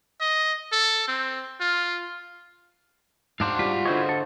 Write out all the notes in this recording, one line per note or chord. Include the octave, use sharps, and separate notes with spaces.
D#5
A4
C4
F4
G#2 D4 F#4 C5 F5
G3 F4 B6
D3 E4 C5 C#5 D#5
A4